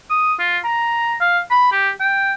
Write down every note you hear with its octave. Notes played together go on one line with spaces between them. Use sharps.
D#6
F4
A#5
F5
B5
G4
G5